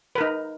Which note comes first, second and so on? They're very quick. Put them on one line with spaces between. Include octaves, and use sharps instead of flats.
B4 A#4 D#4